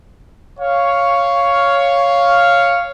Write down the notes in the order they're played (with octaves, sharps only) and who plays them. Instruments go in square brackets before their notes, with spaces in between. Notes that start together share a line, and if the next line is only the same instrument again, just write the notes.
[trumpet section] C#5 F5